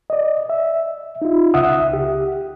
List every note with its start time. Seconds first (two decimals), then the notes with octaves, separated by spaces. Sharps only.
0.10 D5 D#5
0.50 E5
1.22 D#4 F4
1.54 C#2 C#3 E5 F#5 D#6
1.93 G4